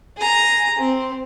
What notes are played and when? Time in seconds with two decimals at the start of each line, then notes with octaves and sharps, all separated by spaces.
0.17 G#4 A#5
0.78 C4